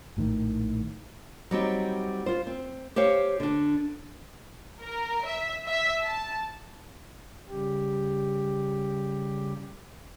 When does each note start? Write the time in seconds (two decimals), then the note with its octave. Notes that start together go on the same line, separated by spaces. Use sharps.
0.17 A#1 A2 D3 D#3
1.51 F#3 G3 C4 D#4
2.26 F4 C5
2.47 C4
2.96 G4 C5 C#5 F5
3.40 D3 D4
4.80 A#4
5.25 E5
5.67 E5
6.03 A5
7.49 C#3 G3 G4